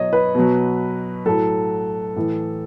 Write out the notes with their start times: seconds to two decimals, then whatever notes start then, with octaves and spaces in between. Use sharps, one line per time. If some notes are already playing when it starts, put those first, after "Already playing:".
Already playing: B2 F#3 C#5 D#5
0.13 B4
0.35 B2 F#3
1.26 A2 F#3 A4
2.16 A2 E3